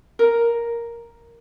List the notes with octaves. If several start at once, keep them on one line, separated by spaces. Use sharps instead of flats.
A#4